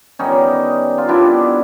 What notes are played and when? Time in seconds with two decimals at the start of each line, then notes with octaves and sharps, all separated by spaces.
0.19 D#3 G3 B3 C#4 D#4
0.98 F4
1.08 D#3 G3 B3 D4 E4